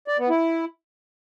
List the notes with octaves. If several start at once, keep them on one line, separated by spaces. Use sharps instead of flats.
D5
B3
E4